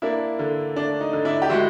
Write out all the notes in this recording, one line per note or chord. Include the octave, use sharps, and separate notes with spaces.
A#3 D4 E4
D3
A3 D4
D#4
D3
D4 E4
G4
G#3 E4 F#4